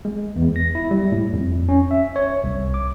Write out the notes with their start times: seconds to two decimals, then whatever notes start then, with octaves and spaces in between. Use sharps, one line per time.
0.05 G#3
0.36 E2
0.56 A#6
0.75 E4
0.91 G3
1.12 A2
1.34 F2
1.69 C#4
1.91 E5
2.16 C#5
2.44 C2
2.74 D6